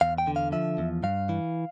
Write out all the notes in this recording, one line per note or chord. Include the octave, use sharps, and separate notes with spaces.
E2 F5
G5
D3
F5
F3 E5
E2
G2 F5
E3